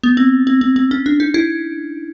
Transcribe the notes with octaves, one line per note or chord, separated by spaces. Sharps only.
B3
C4
C4
C4
C4
C#4
D4
D#4
E4